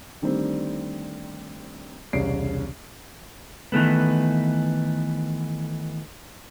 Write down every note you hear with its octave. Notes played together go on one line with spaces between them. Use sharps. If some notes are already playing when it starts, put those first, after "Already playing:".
D3 D#3 G3 A3 C4
E1 C2 C#3 C#5 C7 D7
D#3 E3 A3 B3